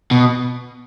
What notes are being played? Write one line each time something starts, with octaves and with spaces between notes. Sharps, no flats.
B2